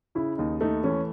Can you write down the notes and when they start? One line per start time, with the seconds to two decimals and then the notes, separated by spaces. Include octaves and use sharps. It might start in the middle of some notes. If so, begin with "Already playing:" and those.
0.15 C#3 E4
0.38 D#2 D#4
0.61 A3 D#4
0.84 E3 C#4